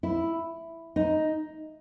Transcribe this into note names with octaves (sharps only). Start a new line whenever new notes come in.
E4
D#4